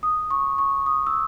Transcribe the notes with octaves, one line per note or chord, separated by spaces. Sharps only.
D#6
C#6
C#6
D#6
E6